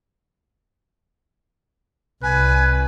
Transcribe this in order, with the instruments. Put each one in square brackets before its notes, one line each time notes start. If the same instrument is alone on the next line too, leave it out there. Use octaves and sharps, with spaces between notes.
[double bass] C2 [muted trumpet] B4 [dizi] G#5